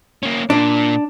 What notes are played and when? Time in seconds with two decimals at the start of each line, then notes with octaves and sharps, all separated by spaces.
0.23 A#3 C#4
0.50 A#2 A#3 D4